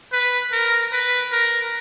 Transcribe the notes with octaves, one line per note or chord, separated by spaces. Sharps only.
B4
A#4
B4
A#4